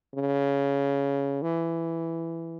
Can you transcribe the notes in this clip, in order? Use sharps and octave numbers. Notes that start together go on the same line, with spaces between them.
C#3
E3